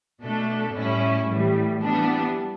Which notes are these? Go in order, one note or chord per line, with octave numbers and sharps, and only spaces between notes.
B2 A3 D4 A4
A2 G3 C#4 E4
A2 E3 G3
E3 G3 B3 D4